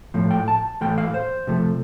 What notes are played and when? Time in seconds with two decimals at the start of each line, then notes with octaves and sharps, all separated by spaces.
0.14 A2 F3 A3
0.31 G5
0.48 A5
0.81 A2 E3 A3 G5
0.98 F5
1.14 C5
1.47 C3 F3 A3